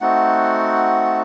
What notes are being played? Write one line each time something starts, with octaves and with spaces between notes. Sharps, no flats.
A3 C4 D#4 F#4 F#5